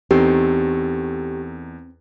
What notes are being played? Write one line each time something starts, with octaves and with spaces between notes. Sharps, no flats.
E2 C4 D#4 G4 A4